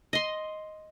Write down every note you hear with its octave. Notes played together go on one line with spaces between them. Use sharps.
D#5 C6